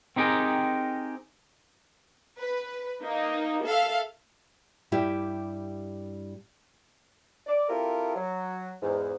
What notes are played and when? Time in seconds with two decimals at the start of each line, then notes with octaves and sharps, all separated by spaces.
0.16 C4 D#4 G4 G#4 A#4
2.40 B4
3.03 A#3 D#4
3.66 A4 E5 F5
4.92 G2 G3 E4 G4
7.46 D5
7.69 C4 E4 F4 G4 A4 A#4
8.16 F#3
8.82 E2 G#2